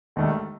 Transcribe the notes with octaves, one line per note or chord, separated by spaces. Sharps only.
E1 D#2 D#3 A3